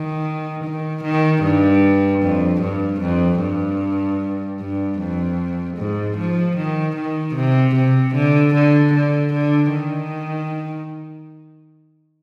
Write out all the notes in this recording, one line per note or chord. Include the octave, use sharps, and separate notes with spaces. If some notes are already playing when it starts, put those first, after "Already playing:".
Already playing: D#3
D#3
D#3
G2
F2
G2
F2
G2
G2
F2
G#2
F3
D#3
D#3
C3
C3
D3
D3
D3
D3
D#3